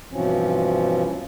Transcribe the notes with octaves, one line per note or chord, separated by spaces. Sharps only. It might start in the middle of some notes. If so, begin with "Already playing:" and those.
G2 B2 E3 F3 C4 C#4